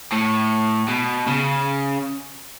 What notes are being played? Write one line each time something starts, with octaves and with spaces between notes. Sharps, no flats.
A2
B2
C#3